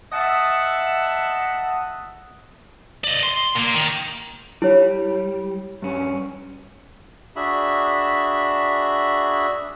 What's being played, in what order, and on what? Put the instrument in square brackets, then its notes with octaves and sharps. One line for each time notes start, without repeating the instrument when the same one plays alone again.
[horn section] D#5 E5 F#5 A5
[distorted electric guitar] D5 D#5
C6
A#2 A#3
D#3
[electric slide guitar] G3 [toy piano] E4 C#5
[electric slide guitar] G2 C#4
[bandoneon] D4 F#4 G#4 E5 B5